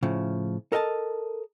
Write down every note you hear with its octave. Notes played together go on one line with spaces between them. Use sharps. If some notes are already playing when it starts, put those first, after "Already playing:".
A2 C#3 F3
A4 A#4 D#5 G5 A5